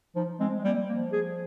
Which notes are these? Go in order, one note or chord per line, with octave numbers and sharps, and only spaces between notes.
F3 D#4
G#3 C4
G#3
G3 A#3
F3 A#3
G#4